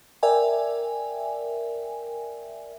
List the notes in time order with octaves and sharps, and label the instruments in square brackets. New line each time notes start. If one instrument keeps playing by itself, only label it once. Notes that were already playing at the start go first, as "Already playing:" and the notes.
[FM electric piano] A#4 D5 E5 G5 G#5